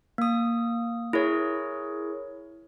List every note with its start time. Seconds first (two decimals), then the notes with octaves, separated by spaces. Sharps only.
0.18 A#3 D#6
1.13 E4 G#4 A#4 C#5